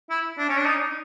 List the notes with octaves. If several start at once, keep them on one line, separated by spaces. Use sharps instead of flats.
E4
D4
C#4
D4
D#4